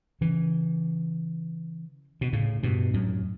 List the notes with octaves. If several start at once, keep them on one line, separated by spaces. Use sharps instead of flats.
C#3 E3
B2
A2 C#3
G2 B2
F#2 A2